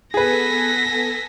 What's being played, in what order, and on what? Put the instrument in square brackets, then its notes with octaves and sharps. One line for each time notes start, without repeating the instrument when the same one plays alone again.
[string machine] B3 A4 G#5 [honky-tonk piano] G#4 B4 [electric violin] A#6 B6